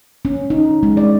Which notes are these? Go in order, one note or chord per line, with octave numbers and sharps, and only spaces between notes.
C#4
D#4
G#3
D5